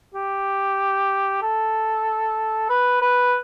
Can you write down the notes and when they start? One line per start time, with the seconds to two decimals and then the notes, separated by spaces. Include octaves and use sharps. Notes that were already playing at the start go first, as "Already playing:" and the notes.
0.15 G4
1.42 A4
2.70 B4
3.02 B4